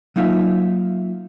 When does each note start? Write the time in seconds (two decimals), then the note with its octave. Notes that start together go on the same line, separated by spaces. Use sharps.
0.16 F#3 A#3 D#4 F4 E5